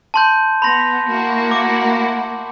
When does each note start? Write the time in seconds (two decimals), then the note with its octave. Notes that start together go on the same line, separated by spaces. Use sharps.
0.14 A5 C6 G6
0.62 B3 B5 C6 A#6
1.08 A#3 E4 F#4
1.51 D6